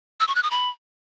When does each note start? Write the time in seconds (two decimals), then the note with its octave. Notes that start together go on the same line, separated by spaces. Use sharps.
0.20 E6
0.28 C#6
0.35 F#6
0.43 D#6
0.51 B5